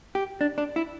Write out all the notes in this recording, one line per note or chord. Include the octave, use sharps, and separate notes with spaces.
G4
D4
D4
E4